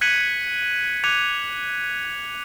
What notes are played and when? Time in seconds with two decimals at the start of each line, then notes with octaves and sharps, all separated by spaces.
0.01 F#6 G#6 B6 C#7 D#7 F#7
1.04 D6 F#6 G#6 C#7 D#7 F7